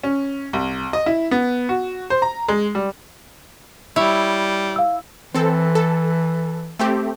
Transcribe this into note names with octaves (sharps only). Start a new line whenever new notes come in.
C#4
C2
D#5
E4
B3
F#4
C5
A#5
G#3
G3
G3 E4 C#5
F5 E6
E3 C4 A4
A4
A3 C4 G4